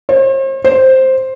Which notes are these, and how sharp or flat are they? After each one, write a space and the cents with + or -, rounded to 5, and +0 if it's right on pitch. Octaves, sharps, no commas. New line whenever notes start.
C5 +45
C5 +5